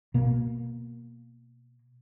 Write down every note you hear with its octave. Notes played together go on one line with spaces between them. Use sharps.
B2 A#3